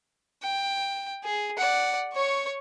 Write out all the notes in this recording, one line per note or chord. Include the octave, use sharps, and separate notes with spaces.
G5
G#4
D5 F#5
C#5 C#6